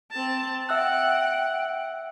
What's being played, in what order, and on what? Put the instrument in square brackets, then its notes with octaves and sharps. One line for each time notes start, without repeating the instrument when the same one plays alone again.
[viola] C4 A5
[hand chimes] E5 E6 F#6 [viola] F#5 [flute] G5